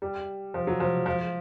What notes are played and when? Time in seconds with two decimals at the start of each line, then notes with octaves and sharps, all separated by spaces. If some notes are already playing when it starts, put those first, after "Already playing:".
0.02 G3
0.54 F3
0.67 F#3
0.80 F3
1.06 F3